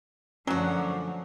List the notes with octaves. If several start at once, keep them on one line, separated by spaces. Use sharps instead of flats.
F#2 D3 F3 F#3 A3 C#4 D4 F#4